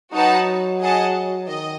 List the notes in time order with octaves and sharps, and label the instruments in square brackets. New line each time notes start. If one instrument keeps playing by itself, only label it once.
[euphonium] F#3 [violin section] D#4 F#4 B4 F#5 A5
[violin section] G#4 D#5 F#5 A5
[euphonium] D#3 [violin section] D#5